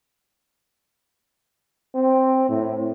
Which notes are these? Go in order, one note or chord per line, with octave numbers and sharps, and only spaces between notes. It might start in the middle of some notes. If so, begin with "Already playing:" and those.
C4
A2